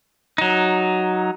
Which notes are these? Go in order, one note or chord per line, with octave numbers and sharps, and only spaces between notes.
F#3 D#4